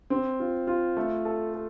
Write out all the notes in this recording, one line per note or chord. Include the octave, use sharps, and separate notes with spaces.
C4
F4
F4
A3
A4
A4